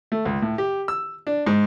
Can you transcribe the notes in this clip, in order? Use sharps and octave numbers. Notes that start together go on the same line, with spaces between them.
A3
C#2
A2
G4
E6
D4
G#2